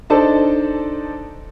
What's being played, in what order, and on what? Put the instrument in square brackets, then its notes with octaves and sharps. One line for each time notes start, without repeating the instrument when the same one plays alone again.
[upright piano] D4 D#4 A4 C5 D5 A5